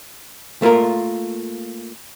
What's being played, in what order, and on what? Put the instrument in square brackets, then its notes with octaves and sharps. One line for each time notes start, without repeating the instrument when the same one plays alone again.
[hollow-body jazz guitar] A3 A#3 F4 A#4